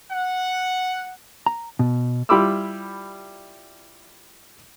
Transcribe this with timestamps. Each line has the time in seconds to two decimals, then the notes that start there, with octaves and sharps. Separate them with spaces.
0.11 F#5
1.46 A#5
1.79 B2
2.29 G3 E4 F4 B5 D6 E6